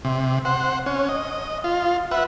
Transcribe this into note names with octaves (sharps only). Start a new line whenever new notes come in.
C3
C5 F#5
C#4
D#5
F4
B4 E5 F#5